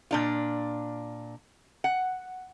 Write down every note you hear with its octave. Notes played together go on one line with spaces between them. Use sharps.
A#2 D4 F4
F#5